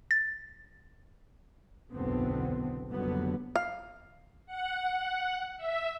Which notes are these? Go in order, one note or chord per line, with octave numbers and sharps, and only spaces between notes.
A6
F#1 B1 E2 D3 B3 C4
F#1 F2 D3 F#3 G3 B3
F5
F#5
E5